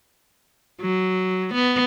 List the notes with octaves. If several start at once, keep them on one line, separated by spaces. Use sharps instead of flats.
F#3
B3